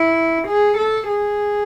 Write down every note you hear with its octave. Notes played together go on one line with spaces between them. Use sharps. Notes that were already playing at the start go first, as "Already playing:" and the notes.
Already playing: E4
G#4
A4
G#4